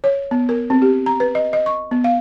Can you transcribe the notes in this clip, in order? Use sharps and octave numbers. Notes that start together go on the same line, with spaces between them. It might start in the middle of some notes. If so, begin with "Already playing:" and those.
C#5
B3
A#4
C4
G4
A#5
B4
D#5
D#5
C#6
B3
F5